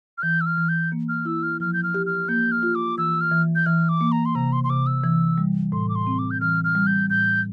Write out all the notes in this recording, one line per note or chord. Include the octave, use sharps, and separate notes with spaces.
F6
E3 G6
E6
F6
E3
G6
A#3
F6
E4 E6
F6
F3 F6
G6
F6
G4
F6
A#3 G6
F6
F4
D6
E3 E6
F6
E3
G6
E3 F6
D6
A#3
A#5
C6
C3 A#5
C6
C6
C3 D6
E6
E3
G3
A2 C6
D6
C6
C4
D6
G6
E3 F6
F6
G3
G6
A2 G6